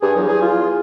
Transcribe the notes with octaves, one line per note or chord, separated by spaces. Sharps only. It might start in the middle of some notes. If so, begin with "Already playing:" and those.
G2 G#4
E2 F#3
G#4
F4